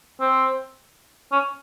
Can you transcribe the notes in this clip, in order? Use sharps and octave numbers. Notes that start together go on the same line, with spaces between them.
C4
C#4